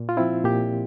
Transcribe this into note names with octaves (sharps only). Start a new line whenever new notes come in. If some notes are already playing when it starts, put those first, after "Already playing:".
Already playing: A#2
F4
F3 C4 E4
A#2 G4